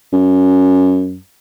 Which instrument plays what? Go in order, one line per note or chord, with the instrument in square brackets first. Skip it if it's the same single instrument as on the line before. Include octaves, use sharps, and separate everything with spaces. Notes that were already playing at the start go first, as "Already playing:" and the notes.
[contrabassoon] F#2